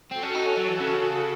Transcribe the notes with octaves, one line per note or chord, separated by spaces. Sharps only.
C4 F#4 A4
C#4
D#4
C#4
F#3
E3
C#3